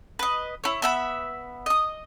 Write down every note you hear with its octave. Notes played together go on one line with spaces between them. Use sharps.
B4 D#5
E4 C#5
B3 E5 B5
D#5 D#6